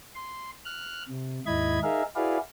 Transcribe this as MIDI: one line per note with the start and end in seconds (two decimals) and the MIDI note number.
0.15 0.51 84
0.65 1.03 89
0.65 1.03 90
1.09 1.40 48
1.46 1.79 39
1.46 1.79 44
1.46 1.79 64
1.46 1.79 75
1.46 1.79 83
1.46 1.79 92
1.83 2.03 63
1.83 2.03 68
1.83 2.03 70
1.83 2.03 76
1.83 2.03 77
2.16 2.38 64
2.16 2.38 66
2.16 2.38 68
2.16 2.38 71
2.16 2.38 74
2.16 2.38 77